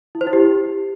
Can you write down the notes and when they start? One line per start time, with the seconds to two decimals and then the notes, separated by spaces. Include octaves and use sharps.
0.15 E4
0.21 C5
0.27 E4
0.33 G4